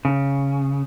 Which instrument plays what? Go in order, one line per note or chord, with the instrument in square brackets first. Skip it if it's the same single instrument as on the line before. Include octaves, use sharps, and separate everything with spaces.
[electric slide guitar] C#3